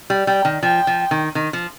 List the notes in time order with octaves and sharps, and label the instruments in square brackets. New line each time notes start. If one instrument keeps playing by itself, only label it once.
[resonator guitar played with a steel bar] G3
[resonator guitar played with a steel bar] G3 [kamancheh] G5
[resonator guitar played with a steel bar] D#3
[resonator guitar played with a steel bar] F3 [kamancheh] G5
[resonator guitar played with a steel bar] F3
D#3
D#3
F3